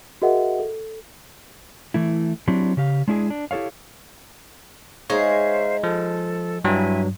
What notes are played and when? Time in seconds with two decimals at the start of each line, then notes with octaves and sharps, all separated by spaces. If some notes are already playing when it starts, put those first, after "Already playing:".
0.22 F#4 G#4 A#4 D#5 E5 F#5
0.59 A4
1.94 E3 A3 E4
2.48 F#3 C4 D4 E4 G4
2.77 C#3 G4 F5
3.08 G#3 D4 E4 G4 G#4
3.30 D4
3.51 E4 G4 A4 C#5 F5
5.10 G#3 D#4 C5 C#5 E5 F5
5.83 F3 A4
6.64 G2 F#3 E4 E5 G#5